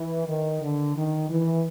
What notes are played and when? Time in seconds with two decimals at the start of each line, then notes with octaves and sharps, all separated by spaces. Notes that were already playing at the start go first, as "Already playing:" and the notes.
Already playing: E3
0.27 D#3
0.62 D3
0.95 D#3
1.29 E3